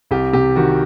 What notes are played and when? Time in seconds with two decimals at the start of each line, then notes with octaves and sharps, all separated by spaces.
0.11 C2 G4
0.33 C3 G4
0.56 D#3 F#4